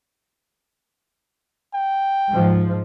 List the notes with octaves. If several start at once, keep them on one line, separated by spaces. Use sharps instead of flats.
G5
G#2 F3